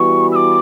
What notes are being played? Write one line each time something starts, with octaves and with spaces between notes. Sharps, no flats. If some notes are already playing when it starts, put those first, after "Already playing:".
Already playing: E3 G3 B3 F#4 C#6
E6
D6